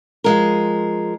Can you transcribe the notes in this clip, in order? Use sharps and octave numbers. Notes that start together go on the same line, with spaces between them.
F3 G#3 A#4